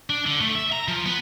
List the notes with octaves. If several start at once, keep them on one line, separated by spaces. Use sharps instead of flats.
D4
D3
A3
E5
A#5
F3
B3